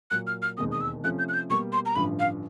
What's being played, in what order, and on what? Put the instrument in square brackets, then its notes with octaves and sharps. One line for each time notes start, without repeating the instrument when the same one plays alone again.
[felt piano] A#2 F#3 A#3 [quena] F#6
[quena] F6
F6
[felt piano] E1 D#2 D#3 G#3 C4 [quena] D#6
[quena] D#6
E6
[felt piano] C3 F3 A3 C#4 [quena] F#6
[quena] G6
F#6
G6
[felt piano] B2 G3 A#3 [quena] C#6
[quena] C6
A#5
[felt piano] A1 G2 D3 F3 [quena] B5
[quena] F5